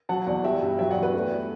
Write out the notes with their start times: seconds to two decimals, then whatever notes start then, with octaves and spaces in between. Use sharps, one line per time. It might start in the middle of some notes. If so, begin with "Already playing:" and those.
0.09 F#3 F#5 A5
0.27 E2 D5 F#5
0.44 G3 E5 G5
0.61 G2
0.79 F#3 E5 G5
0.91 D5 F#5
0.97 E2
1.02 B4 D5
1.13 A3